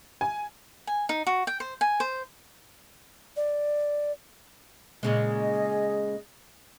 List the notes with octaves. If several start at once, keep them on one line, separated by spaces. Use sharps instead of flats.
G#5
G#5
D#4
F#4
G5
C5
G#5
C5
D5
A#2 C#3 G#3 G#4 D#5